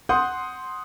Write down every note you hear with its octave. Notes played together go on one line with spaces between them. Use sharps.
F#5 C6 D#6 G6